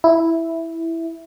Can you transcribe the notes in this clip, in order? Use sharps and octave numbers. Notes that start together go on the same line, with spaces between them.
E4